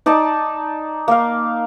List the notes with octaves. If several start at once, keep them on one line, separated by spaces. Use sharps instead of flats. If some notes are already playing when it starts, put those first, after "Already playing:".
D#4 D5 A5
A#3 F5